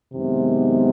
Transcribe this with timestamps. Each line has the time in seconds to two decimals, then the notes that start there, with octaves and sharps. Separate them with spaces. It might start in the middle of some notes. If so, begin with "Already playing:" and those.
0.13 F#2 C3 D#3 G#3 B3